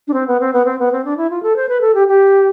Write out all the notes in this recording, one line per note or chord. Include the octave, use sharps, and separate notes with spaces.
D4
C4
B3
C4
B3
C4
B3
C4
D4
E4
F4
A4
C5
B4
A4
G4
G4